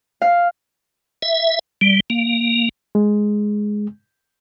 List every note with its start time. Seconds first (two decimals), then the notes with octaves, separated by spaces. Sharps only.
0.22 F5
1.22 E5
1.81 G3
2.10 A#3
2.95 G#3